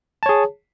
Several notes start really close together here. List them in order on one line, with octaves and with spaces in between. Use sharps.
A5 C#5 G#4